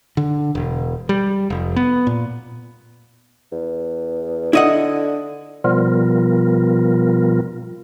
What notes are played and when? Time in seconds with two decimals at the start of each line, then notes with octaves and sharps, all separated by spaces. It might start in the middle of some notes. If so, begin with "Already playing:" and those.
0.17 D3
0.55 E1
1.09 G3
1.50 F1
1.76 B3
2.07 A#2
3.52 E2
4.53 D3 E4 D#5 F#5
5.64 B2 F3 G3 B3 F4 A#4